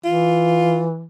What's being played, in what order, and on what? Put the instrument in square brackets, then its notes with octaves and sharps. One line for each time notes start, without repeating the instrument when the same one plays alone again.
[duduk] E3 [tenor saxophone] F4